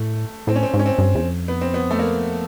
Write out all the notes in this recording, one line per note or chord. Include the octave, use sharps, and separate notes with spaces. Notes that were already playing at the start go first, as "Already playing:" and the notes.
Already playing: A2 A3
A2 C4
C#4
C4
G#2
C#4
C4
G2
E2
F2
B3
C4
B3
A3
A#3